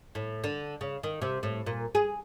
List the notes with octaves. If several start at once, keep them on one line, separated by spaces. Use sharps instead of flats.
A2
D3
C#3
D#3
C3
A2
A#2
G#4